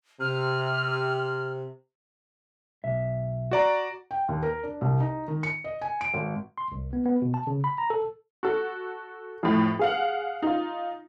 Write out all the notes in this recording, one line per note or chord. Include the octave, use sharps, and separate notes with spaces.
C3 F6
B1 E5
F#4 D5 A#5
G5
D#2
A#4
D4
C2
D#4
D#3
C#7
D#5
G#5
D7
G#1
C6
C2
B3
B3
B2
A5
C#3
B5
A#5
A4
F#4 A4
F2 A2
G#4 F5 F#5
D#4 F4